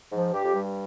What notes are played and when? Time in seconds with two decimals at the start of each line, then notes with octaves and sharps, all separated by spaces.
0.12 G#2 F3
0.33 G2 G4
0.44 F2
0.54 G2 G3